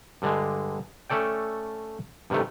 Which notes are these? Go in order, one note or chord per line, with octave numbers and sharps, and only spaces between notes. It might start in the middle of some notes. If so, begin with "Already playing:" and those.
G2 D3 G#3
A3 C#4 A4 D5 G5
G2 C3 D#3 A3